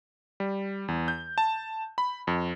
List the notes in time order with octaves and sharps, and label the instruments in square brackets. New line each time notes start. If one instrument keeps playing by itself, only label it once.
[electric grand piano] G3
E2
G6
A5
B5
F2